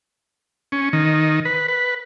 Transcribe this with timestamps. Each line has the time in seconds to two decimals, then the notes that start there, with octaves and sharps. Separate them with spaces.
0.72 C#4
0.93 D#3
1.45 B4
1.68 B4